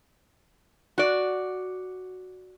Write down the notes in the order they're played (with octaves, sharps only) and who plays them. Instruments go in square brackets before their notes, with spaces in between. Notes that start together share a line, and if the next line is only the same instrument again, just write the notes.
[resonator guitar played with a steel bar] F#4 D5